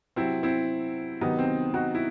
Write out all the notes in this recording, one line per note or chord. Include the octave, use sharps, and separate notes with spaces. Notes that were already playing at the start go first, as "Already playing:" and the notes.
C3 F#3 C4 E4
C4 E4
C3 D#3 F#3 B3 D#4
C4
D#4 F#4
E4